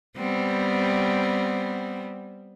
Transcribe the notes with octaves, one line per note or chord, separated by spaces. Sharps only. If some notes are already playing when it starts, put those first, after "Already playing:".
G3 B3 C4